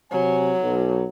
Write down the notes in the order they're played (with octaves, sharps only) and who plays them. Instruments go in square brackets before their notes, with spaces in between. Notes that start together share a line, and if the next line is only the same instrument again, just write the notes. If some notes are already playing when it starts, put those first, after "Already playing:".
[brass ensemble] C3 G#5 [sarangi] F#3
[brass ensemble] B1